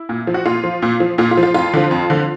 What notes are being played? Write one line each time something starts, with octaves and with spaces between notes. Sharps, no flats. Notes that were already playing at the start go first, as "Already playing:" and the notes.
Already playing: E4
A#2
F3
F#4
A#2 F4
F3
A#2
F3
A#2 F4
F4
F3
F4
F2 F4
D3 F3
F2
D3 F3